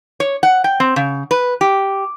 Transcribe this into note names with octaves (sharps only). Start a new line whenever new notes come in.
C#5
F#5
G5
C4
C#3
B4
G4